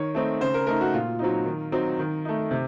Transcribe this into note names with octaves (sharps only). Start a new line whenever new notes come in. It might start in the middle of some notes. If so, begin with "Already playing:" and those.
Already playing: D#3 C#5
A3 C4 D#4
C#3 C5
A#4
A3 D#4 A#4
F#4
A#2 F4
F#3 C4 D#4
D#3
F#3 C4 D#4
D#3
A3 D#4
C3